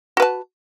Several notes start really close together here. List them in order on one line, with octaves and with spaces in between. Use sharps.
F#4 B4 A5